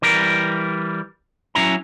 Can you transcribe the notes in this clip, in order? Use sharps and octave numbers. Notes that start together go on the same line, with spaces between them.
E3 G3 A#4
F#3 C#4 E4 A#5